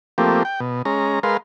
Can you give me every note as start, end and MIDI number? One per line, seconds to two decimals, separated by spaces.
0.18 0.43 53
0.18 0.43 57
0.18 0.43 58
0.18 0.43 60
0.18 0.43 67
0.45 0.60 79
0.60 0.82 47
0.85 1.19 56
0.85 1.19 61
0.85 1.19 82
1.23 1.37 56
1.23 1.37 70
1.23 1.37 71
1.23 1.37 77
1.23 1.37 84